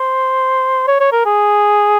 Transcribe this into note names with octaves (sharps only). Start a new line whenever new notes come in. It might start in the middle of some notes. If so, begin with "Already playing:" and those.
Already playing: C5
C#5
C#5
A#4
G#4